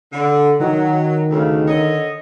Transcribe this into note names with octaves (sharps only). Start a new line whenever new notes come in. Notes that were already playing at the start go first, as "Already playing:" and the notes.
D3
D#3 F#3
D2 C#3
D3 C#5 D#5